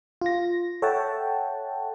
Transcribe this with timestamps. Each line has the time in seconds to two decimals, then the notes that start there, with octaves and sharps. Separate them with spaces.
0.21 F4 A#6
0.82 A4 C#5 E5 F#5 G5 A5